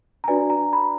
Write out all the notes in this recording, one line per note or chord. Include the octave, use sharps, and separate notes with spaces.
A#5
D4 F#4 B4 D5 G#5
A#5
B5